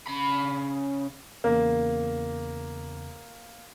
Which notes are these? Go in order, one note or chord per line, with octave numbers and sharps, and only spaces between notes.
C#3 B5
E2 C#3 A#3